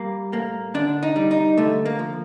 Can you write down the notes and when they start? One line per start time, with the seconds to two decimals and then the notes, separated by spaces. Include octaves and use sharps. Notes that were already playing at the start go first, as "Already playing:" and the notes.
Already playing: G3 A#3
0.32 A2 A#3
0.74 D3 D4
1.03 D#4
1.16 G3
1.31 D#4
1.58 D3 A3
1.85 A#3
1.99 F3